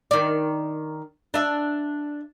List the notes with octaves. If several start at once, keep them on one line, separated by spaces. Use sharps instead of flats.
D#3 D5
D4 E5